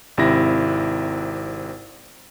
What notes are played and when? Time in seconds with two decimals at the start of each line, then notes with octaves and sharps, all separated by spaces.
0.17 G#1 C3 E4 A#6